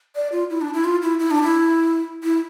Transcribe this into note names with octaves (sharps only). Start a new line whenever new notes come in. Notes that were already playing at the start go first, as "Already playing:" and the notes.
D5
F4
E4
D4
E4
F4
E4
E4
D4
E4
E4